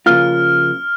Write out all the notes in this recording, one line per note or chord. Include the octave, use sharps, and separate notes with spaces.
C#3 F3 A#3 F4 F6